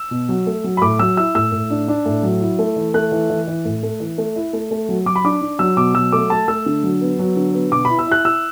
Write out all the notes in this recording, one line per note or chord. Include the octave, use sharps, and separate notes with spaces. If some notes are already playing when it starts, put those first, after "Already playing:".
Already playing: E6
B2
F#3
A3
F#3
B5
A2 D6
F#3 E6
E4 E6
A2 E6
A2
D4
D4
A2
F#3
E4
A3
E3
A3 F#6
E3
E3
E3
A2
A3
E3
A3
E4
A3
A3
F#3
F#3 D6
B5
D4 D6
D4
F#3 E6
B2 D6
F#3 E6
A3 D6
A3 A5
A3 E6
D3
F#3
B3
F#3
D3
B3
B2 D6
E4 B5
E6
E4 F#6
E4 E6